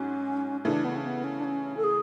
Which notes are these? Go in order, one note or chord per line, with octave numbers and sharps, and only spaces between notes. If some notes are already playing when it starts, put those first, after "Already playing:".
Already playing: G#2 F#3 C#4
C#3 E3 A3 D4
B3
C#4
B3
C#4
D4
C#4
A4
G#4